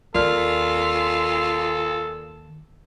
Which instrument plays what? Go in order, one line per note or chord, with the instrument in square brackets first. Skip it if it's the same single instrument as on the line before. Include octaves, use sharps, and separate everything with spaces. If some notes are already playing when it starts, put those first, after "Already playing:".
[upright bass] D#2 [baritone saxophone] F4 [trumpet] A4 [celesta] A#4 D5 F6